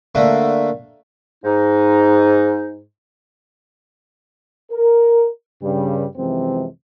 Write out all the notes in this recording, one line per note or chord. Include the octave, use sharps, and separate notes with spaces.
D3 A3 A#3
G#2 D#4
A#4
G2 C#3 G3
F#2 C3 E3 F3 G#3 C4